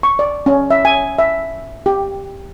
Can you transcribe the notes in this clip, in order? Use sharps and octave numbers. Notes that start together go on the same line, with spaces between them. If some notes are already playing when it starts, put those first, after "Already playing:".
C#6
D5
C#4
E5
G#5
E5
G4